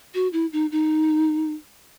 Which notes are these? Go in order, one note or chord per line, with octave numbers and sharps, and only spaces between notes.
F#4
E4
D#4
D#4